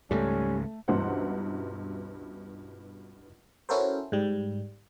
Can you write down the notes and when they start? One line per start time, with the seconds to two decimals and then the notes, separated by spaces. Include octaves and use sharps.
0.11 C#2 G#2 C#3 G3 A3 C#4
0.88 C#2 G2 B2 E3 C5 F#5
3.69 C#4 E4 F#4 A4 A#4 C5
4.12 G#2 G3